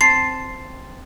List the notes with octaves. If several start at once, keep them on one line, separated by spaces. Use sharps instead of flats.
C4 A5 C6 C7